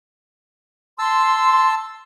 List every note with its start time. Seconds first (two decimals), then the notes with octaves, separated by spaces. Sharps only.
0.99 A5 C6 E6